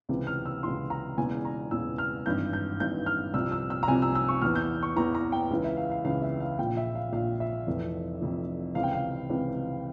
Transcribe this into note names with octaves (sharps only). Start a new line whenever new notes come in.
C#2 C3 E3
F6
E6
C#2 C3 E3 C6
A#5
E1 E2 C#3 E3 G#5
A#5
E1 E2 C#3 E3 E6
F6
G#1 G2 E3 G6
G6
G#1 G2 E3 G6
F6
C2 C3 F3 E6
E6
E6
A#5
C2 C3 F3 G#5
E6
E6
C#6
E2 E3 F6
G6
C#6
E2 E3 A#5
A#5
G5
C#2 C#3 E3
E5
F5
F5
C#2 C#3 E3 F5
E5
F5
A#1 A#2 F3 G5
E5
F5
A#1 A#2 F3 F5
E5
F1 F2 E3
F1 F2 E3
C#2 C3 E3 F5
G5
F5
C#2 C3 E3